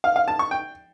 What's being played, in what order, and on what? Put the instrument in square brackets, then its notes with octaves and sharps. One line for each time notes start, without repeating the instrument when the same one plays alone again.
[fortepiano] F5
F5
A5
C#6
G5